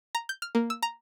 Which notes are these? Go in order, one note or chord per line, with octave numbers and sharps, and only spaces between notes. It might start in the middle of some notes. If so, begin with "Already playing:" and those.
A#5
G6
F6
A#3
E6
A#5